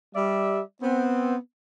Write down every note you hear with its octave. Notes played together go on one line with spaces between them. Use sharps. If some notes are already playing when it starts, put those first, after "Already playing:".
G3 D5 E5
B3 C4